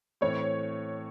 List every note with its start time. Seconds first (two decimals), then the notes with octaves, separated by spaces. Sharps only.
0.21 A2 E3 C4 C#5